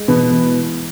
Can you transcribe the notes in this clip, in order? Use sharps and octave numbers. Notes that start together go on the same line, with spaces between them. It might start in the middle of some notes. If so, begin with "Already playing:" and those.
Already playing: G#3
B2 E3 B3
E3